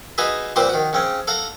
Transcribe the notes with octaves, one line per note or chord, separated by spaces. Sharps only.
D#4 F#4 G#4 B4 D#5 E5
A#2 G3 C4 B4 C5
D#3 F#4
C#3 C4 C#4
A4 F5 F#5 A#5